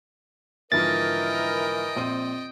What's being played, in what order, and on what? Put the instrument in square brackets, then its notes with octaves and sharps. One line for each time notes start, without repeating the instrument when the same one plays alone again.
[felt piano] G#2 D3 F3 [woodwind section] E3 A#4 [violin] D#5 G5 [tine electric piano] A6
[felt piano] A#1 C4 D#7